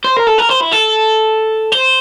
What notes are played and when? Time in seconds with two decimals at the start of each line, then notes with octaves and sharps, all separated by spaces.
0.04 C5
0.17 A#4
0.27 A4
0.38 A#4
0.49 C5
0.60 E4
0.71 A4
1.72 C5